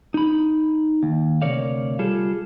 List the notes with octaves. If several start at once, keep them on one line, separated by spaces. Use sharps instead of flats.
D#4 B5
D#2
D2 C3 A#4 C#5 D5 F5
G3 F4 G#4 A4